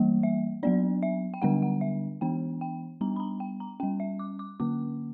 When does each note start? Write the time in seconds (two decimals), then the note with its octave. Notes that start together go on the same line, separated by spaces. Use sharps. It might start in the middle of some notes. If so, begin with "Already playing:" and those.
Already playing: E3 G3 A#3
0.23 E5
0.63 F#3 B3 D4 D5
1.03 E5
1.34 G5
1.42 D3 G3 B3 D4 F#5
1.62 F#5
1.81 E5
2.21 E3 B3 D4 G5
2.61 G5
3.01 G3 B3 D4 A#5
3.16 B5
3.20 A#5
3.40 G5
3.60 A#5
3.80 G3 C#4 G5
4.00 E5
4.19 D6
4.39 D6
4.60 D3 A#3 C#4 D6